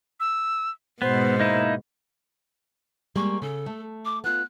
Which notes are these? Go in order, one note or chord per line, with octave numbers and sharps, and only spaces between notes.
E6
G#2 B2 B3 C5
A#3 D#4 E4
G3 G#3 A#3 C#6
C#3 A4
A3
D6
B3 F4 F#6